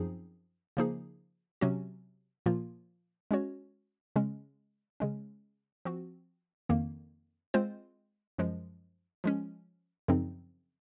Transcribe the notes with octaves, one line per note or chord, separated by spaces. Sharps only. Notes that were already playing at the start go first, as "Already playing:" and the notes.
Already playing: F#2 F3 C4 D#4 G#4
C#3 F3 A#3 D#4 G#4
C3 F#3 C#4 F#4
A#2 F3 A#3 F4
G#3 C#4 F#4 C#5
C#3 G#3 C#4
C#3 G#3 C#4
F3 C4 F#4
F2 D#3 A#3
G#3 C4 F4 C5
F#2 F3 G#3
F3 G#3 C#4
F#2 C#3 F3 C4 D#4